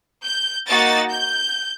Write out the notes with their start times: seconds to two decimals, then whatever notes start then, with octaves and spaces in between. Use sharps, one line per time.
0.25 G6
0.68 A#3 D#4 F#4 A6
1.11 G6